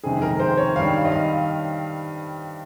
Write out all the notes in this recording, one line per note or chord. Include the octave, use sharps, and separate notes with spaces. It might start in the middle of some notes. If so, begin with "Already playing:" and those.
F2 C3 D#3 G#3 G#4
A#4
C5
C#5
G2 D#3 G3 F5
D#5
F5